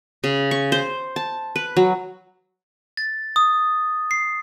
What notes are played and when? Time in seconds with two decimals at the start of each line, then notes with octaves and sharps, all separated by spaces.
0.24 C#3
0.51 C#6
0.72 C5
1.16 A5
1.56 B4
1.77 F#3
2.97 A6
3.36 D#6
4.11 C7